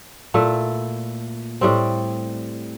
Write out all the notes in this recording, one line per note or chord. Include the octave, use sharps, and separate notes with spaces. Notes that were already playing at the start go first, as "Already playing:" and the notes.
A#2 A3 E4
A2 G3 C4